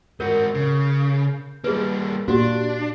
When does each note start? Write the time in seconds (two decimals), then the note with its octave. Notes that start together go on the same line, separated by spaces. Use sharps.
0.20 G#2 F#4 A#4 G6
0.54 C#3
1.64 G3 A#3 G#4 B4
2.28 A#2 D4 F#4 G4